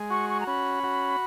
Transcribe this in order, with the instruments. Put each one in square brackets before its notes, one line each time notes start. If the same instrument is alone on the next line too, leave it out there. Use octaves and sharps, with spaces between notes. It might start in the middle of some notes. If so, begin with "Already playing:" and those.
Already playing: [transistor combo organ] G#3
[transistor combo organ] F#4 [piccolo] C#6
[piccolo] C#6
A#5
[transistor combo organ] C#4 [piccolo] B5
[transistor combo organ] F#4